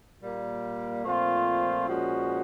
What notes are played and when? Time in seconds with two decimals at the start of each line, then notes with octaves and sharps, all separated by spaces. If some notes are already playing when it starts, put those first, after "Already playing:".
0.21 A#2 G3 A#3
1.04 A#2 F3 A3 C4 F4
1.86 A#2 F3 G#3 C#4 F#4